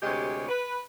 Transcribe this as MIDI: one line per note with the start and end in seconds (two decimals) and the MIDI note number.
0.03 0.48 38
0.03 0.48 48
0.03 0.48 56
0.03 0.48 67
0.03 0.48 73
0.48 0.79 71